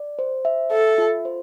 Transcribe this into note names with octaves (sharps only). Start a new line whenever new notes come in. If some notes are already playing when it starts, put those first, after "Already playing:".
Already playing: D5
C5
E5
A4 E5
F4
C5